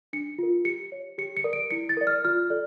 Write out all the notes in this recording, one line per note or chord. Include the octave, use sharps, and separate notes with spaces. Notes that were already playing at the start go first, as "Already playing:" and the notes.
D4 C#7
F4 A#4
G4 C#7
C#5
G4 C#7
C#7
A#4 D5
D7
E4 C#7
A6
A#4 D5
F6
F4 F6
A4 D5